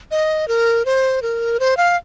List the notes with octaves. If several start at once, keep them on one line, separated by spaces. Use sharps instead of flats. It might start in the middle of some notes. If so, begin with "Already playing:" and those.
D#5
A#4
C5
A#4
C5
F5